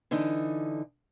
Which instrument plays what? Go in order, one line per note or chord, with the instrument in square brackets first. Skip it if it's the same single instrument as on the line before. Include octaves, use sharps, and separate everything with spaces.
[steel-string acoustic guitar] D3 E3 D#4